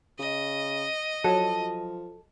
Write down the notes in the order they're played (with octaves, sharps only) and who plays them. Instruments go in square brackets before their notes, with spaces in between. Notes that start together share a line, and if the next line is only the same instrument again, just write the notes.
[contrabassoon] C#3 [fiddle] D#5
[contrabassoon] F3 [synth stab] F#3 [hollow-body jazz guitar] A4